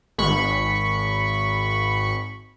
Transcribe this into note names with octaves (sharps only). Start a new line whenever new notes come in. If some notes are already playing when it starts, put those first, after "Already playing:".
G#1 B5 C#6